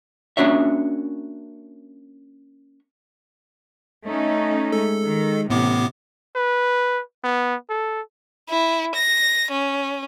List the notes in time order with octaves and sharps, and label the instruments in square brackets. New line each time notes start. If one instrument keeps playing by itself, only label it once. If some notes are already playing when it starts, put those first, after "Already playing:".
[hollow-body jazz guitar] A#3 C#4 D4 F#4 C#5 E5
[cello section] A3 C#4 D#4
[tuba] G#3 [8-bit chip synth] A4
[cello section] D#3
[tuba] A1 [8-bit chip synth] A2 B3 D6 [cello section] C3
[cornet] B4
B3
A4
[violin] E4
A#6
C#4